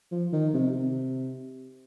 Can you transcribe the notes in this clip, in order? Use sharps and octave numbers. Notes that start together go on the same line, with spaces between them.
F3
D#3
C3
C3